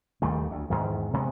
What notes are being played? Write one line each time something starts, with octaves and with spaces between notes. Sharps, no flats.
D#2 D#3 G3 A3
D2
E2 G#2 D#3
C3 G#3 B3